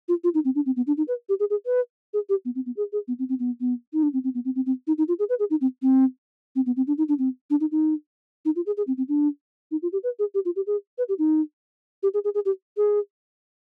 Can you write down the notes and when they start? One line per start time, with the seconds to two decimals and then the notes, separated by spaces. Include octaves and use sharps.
0.08 F4
0.24 F4
0.34 D#4
0.45 C4
0.55 D4
0.66 C4
0.76 B3
0.87 D4
0.97 D#4
1.08 B4
1.29 G4
1.40 G#4
1.50 G#4
1.66 B4
2.13 G#4
2.29 G4
2.45 B3
2.55 C4
2.66 B3
2.76 G#4
2.92 G#4
3.08 B3
3.19 C4
3.29 C4
3.39 B3
3.60 B3
3.93 D#4
4.03 D4
4.13 C4
4.24 C4
4.34 B3
4.45 C4
4.55 C4
4.66 C4
4.87 D#4
4.98 D#4
5.08 F4
5.19 G#4
5.29 B4
5.39 G#4
5.50 D#4
5.61 C4
5.82 C4
6.55 C4
6.66 B3
6.77 C4
6.87 D4
6.98 D#4
7.08 D4
7.19 C4
7.50 D4
7.61 D#4
7.71 D#4
8.45 D#4
8.56 F4
8.66 G#4
8.77 G#4
8.87 C4
8.97 C4
9.08 D4
9.71 D#4
9.82 F4
9.92 G4
10.03 B4
10.19 G#4
10.34 G4
10.45 F4
10.56 G4
10.66 G#4
10.98 B4
11.09 G4
11.18 D#4
12.03 G4
12.14 G#4
12.24 G#4
12.34 G#4
12.45 G4
12.77 G#4